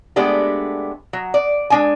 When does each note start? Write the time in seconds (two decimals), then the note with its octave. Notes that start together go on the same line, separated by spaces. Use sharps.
0.16 G#3 A3 B3 D4 G4
1.13 F#3
1.34 D5
1.70 G#3 D4 G#5